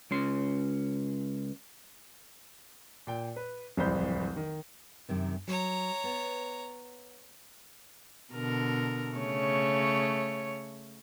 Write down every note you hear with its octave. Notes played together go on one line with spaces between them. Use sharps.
C#2 C#4 C6
A#2 G5
B4
D1 C2 F2 C5 B5 G6
D#3
F#2 C3 D#3
F#3 C#5 A#5
B3
B2 D3 A#4
C#3 A3 C#5